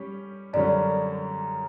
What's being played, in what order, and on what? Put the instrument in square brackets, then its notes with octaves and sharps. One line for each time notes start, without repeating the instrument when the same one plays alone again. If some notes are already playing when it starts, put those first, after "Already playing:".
Already playing: [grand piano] G3 C#4 G4
[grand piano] F#2 D3 G3 C#4 [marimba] D5